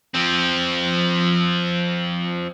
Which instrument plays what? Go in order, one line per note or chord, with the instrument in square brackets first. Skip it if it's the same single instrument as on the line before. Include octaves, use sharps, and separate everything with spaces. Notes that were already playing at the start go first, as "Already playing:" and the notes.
[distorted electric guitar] F3 C4